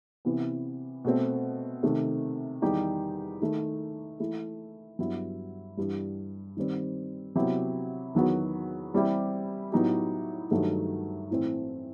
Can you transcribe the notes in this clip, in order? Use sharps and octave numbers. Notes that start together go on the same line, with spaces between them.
C3 E3 B3
B2 A3 C4
C3 D#3 A3
E2 D#3 G3 D#4 G4
D#3 A3 D#4
E3 A3 E4
G2 F#3 B3 E4
G2 E3 G3
D#3 G3 C4
C3 F#3 B3 E4 G4
E2 D#3 F#3 B3 F#4
E3 G3 C4 E4 G4
A2 F#3 B3 D#4 G4
G2 D#3 F#3 A3 D#4
A2 E3 A3 C4